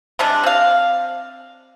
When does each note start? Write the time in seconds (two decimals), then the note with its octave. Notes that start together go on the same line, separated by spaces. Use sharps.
0.19 C3 G3 G#3 D4
0.44 C4 F5